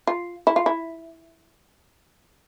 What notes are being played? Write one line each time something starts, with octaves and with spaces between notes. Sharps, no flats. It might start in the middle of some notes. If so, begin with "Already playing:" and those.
F4
E4
F4
E4